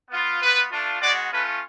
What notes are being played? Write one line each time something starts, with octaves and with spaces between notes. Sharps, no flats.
B3 F4
B3 F4 B4
A3 D4 F4
G#3 B3 F#4 D5
A3 C#4 F4 B4